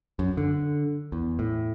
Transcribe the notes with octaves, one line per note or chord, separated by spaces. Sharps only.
F#2
D3
E2
A2